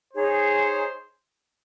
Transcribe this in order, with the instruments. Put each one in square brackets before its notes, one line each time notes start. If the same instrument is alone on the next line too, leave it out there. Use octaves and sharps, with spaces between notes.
[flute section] D#4 G#4 C#5 [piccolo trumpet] C5